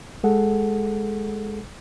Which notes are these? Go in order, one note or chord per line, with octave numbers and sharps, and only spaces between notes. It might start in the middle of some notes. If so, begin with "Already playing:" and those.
G#3 G#4 A4 F#5